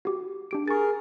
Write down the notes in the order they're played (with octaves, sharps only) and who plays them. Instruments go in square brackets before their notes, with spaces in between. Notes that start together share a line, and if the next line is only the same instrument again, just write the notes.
[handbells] F#4 G4
D4 G4 D7
[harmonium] G#4 A#4 [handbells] C#6 A6